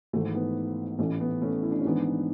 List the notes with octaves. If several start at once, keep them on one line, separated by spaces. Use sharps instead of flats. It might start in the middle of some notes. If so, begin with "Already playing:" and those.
G#1 G#2 E3 A3
B3
A1 A2 E3 A3 C#4
B3
A3 C#4
E4
D4
C#4
G#1 G#2 E3 B3 D4